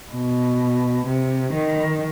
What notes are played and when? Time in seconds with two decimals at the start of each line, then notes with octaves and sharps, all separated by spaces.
0.12 B2
1.07 C3
1.53 D#3